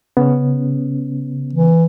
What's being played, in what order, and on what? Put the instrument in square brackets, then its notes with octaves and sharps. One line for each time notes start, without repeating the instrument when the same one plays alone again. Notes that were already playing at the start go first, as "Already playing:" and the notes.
[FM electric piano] C#3 [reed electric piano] B3 C#4
[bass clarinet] E3